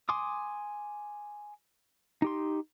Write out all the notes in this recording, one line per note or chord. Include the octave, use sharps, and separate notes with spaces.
G#5 C6 D6 D#6
D#4 G4 C6